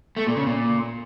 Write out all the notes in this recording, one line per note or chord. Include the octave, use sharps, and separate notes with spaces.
A3
A#2
C#3
A#2